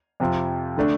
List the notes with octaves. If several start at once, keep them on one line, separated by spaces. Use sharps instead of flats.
F2 C3 F3
D3 A3 D4